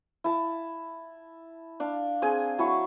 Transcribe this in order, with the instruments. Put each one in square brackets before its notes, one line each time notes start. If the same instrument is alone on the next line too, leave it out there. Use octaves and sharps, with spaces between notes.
[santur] E4 A5
D4 F5
C4 G#4 G#5
F#3 E4 A5 C#6